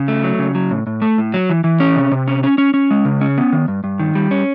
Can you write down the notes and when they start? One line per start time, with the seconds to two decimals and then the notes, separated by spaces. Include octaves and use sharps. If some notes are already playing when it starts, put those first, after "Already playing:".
Already playing: C#3
0.08 A3
0.24 F#3
0.39 C#3
0.55 F#3
0.71 A2
0.87 A2
1.02 A3
1.18 A2
1.34 F#3
1.50 E3
1.64 E3
1.80 C#4
1.96 C3
2.12 C3
2.28 C#4
2.43 C#4
2.58 C#4
2.74 C#4
2.91 G#3
3.05 C#3
3.21 C#4
3.38 B3
3.53 D#3
3.68 G2
3.84 G2
3.99 D#3
4.15 G3
4.31 C#4